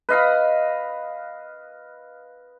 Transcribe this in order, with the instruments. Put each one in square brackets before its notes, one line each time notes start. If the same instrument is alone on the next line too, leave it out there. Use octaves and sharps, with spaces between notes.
[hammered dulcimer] B4 D#5 F5 B5